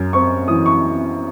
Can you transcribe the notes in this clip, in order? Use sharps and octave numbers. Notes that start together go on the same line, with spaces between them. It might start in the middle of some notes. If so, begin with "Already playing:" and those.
Already playing: F#2
C4 C#6
E3 D#6
C#6